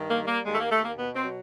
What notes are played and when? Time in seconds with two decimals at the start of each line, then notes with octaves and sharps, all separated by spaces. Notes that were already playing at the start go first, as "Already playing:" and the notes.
Already playing: G2 D#3
0.10 A#3
0.19 G3
0.28 A#3
0.45 D#2 G#3
0.54 A3
0.59 A#3
0.72 D#2 A3
0.84 A#3
0.98 B2 B3
1.16 C4
1.25 F#3